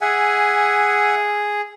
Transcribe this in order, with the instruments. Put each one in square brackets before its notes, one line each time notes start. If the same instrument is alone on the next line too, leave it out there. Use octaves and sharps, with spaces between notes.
[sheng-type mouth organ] G#4 [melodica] E5 F#5 G#5